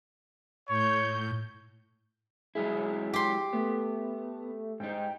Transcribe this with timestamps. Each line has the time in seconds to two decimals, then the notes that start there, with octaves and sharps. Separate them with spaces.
0.69 A2 C#5 G6
2.55 F#3 G#3 E4 G#4
3.14 G4 C6
3.53 A3 B3
4.80 G#2 D#4 G5